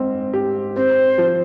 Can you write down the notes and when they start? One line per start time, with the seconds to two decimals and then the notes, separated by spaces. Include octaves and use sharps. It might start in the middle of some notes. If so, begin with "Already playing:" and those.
Already playing: G#2 C4
0.33 G4
0.76 C4 C5
1.18 F3